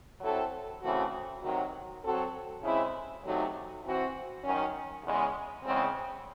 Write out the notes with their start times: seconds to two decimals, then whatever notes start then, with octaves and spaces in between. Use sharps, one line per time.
0.21 F#3 C4 E4 A4
0.82 C#3 E3 A3 C4 F#4
1.42 C3 D#3 F#3
2.03 F#3 C4 F#4 A4
2.62 C#3 G#3 C4 E4
3.22 E2 C3 F#3 A3 D#4
3.84 E3 C4 F#4
4.43 F#2 D#3 F#3 C#4
5.03 E2 C#3 G#3 C#4
5.63 E2 C#3 G#3 C4